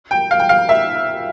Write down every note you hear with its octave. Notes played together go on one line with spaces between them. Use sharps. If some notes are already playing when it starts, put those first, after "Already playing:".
G5
F5
G5
F5
E5